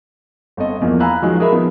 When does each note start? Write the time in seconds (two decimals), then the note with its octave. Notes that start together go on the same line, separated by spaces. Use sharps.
0.57 G1 C4 A4 D#5
0.81 E2 F3 A#3
1.00 F5 G#5 A#5 B5 E6 F#6
1.22 D#3 F3 F#3 G#3 D#5
1.40 G#4 A#4 E5 B5
1.53 F3 B3 D#4